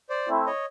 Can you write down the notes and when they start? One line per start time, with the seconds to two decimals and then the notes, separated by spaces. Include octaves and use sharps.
0.09 C5 D5
0.28 A3 C4 E4
0.46 C#5 D#5